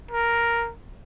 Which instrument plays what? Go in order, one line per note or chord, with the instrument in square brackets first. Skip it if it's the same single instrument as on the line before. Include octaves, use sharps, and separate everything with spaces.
[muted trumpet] A#4